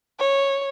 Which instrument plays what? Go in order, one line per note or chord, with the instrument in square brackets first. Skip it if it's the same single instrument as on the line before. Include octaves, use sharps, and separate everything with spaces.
[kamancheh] C#5